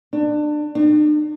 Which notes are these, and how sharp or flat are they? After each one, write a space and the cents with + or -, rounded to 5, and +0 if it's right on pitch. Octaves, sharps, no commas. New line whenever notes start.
D4 +25
D4 +45